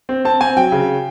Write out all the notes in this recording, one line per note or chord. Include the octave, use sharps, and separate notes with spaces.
C4
C4 A5
C4 G#5
F#3 G5
C#3